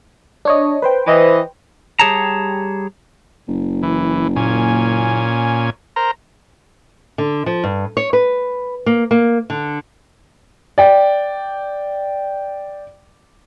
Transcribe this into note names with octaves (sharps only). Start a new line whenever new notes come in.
D4 C#5 D#5
B4 C5 G5
E3 D#5
G3 G4 G#4 C#5 A5 A#5
F#1
E3
A#2 C#4 G#5
A#4 C5 A#5
D3
F3
G2
C#5
B4
A#3
A#3
D3
D5 G5